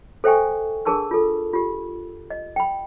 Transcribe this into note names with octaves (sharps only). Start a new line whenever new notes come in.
A4 C5 E5 G5 G#5 C#6
D4 G#4 A#4 A5 C#6 E6
F4 A4
F4 G4
D#5
G5 B5